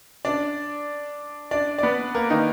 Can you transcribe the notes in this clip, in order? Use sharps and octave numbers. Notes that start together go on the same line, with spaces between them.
D4 D5
D4 D5
D5
B3 B4
A#3 A#4
D#3 D#4